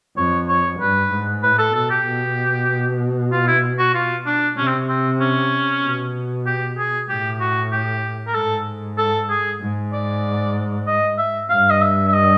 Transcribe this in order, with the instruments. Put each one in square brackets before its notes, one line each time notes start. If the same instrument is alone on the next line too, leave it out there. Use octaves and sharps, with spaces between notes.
[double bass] F2 [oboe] C#5
[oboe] C#5
[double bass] G2 [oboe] B4
[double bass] G#2
[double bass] A2 [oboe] B4
[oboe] A4
[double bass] B2 [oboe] A4
[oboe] G4
[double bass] B2
[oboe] F4
E4
F#4
F4
D4
[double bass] C3 [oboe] C#4
[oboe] C4
C4
C#4
[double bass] B2
[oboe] G4
G#4
[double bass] A2 [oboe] G4
[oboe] F#4
G4
A#4
[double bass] G#2 [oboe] A4
[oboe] A4
G#4
[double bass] G#2
[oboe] D5
D#5
E5
[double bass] G2 [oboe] F5
[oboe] D#5
E5
E5
D#5